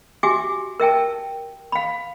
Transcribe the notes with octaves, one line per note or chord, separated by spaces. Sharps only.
F#4 G4 E5 G#5 D6
A#4 E5 G5 A5
F5 B5